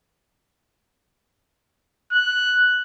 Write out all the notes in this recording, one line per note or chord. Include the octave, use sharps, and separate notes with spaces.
F#6